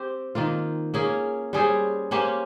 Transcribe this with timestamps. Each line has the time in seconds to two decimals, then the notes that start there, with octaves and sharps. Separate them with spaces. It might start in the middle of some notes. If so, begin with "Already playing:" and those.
Already playing: C4 G4 C5
0.35 D#3 A#3 F4
0.94 A#3 C#4 G#4
1.53 G3 C#4 G#4 C5
2.11 A#3 C#4 G4 C5